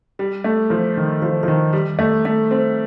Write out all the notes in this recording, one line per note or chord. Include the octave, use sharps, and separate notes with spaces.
G3
A3
F3
D#3
F3
F3
D#3
G3
A3
A3
C4